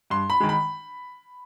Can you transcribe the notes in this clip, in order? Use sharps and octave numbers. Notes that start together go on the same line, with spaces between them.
G2 C6
B5
D#3 G#3
B5